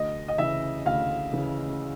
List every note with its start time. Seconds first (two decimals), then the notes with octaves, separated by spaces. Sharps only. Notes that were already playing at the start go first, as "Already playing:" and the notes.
Already playing: D2 D#5
0.28 D#5
0.38 C#3 E3 E5
0.85 D2 F5
1.32 C#3 E3